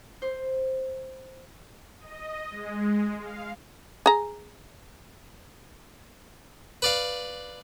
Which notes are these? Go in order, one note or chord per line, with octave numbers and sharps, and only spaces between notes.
C5
D#5
G#3
F5
G#4 A#5
B4 D5 F5